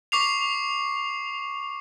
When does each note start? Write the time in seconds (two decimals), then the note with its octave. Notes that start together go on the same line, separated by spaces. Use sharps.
0.12 C#6 D6 C7 F7